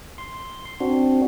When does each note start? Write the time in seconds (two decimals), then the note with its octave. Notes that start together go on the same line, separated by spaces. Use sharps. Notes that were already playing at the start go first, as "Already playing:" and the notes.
0.18 C6
0.80 C4 D4 F#4